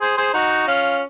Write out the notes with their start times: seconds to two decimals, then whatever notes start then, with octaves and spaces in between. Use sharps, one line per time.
0.01 G#4 C5
0.17 G#4 C5
0.34 D#4 F#4
0.67 C#4 F4